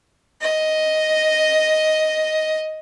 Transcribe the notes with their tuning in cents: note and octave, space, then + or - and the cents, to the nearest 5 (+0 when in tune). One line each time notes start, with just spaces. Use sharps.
D#5 +5